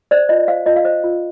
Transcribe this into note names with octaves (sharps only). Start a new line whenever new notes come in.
C5 D5
F4 D#5
C5 F5
F4 D#5
F5
C5 D#5
F4